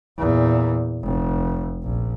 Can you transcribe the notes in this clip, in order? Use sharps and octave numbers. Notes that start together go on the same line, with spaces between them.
E2 A#2
F1
A#1